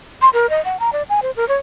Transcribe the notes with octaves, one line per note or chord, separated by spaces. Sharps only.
C6
A#4
D#5
F#5
A#5
D5
G#5
C5
A#4
C#5